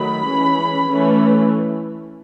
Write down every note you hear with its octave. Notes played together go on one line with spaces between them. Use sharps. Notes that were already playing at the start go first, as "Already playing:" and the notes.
Already playing: D#3 F#3 A3 B5
E3 G#3 C#4
E3 A3 C#4